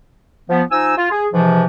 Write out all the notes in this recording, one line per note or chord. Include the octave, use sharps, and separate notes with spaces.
F3 B3
F3 D#4 G#5 E6
F4
G#4
G#2 C3 E3 F3